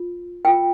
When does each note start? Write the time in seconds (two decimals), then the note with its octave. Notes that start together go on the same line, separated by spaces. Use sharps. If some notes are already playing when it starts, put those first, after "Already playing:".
Already playing: F4
0.45 F4 A#4 G5